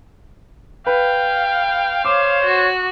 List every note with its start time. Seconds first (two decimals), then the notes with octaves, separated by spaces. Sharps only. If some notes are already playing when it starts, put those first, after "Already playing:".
0.86 B4 F5 G5
2.05 C5 C#5 D6
2.44 F#4